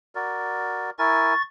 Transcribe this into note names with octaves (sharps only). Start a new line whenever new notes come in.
F#4 A#4 D5
E4 A#4 G#5 C#6 A6